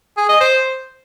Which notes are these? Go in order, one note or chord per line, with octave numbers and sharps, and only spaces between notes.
G#4
D#5
C5